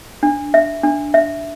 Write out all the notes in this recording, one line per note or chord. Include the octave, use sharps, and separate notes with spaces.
D4
E5
D4
E5